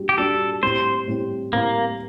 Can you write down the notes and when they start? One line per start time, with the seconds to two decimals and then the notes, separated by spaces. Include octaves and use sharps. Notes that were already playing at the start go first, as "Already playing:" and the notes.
Already playing: G3 D4 F#4
0.09 G4
0.18 G3 D4 F#4 A4
0.63 A2 G3 C4 C5
1.07 A2 G3 C4
1.52 A2 G3 A#3 C4